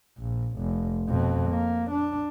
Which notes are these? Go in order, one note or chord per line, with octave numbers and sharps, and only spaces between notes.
A#1
F1
F2 B2
A#3
D4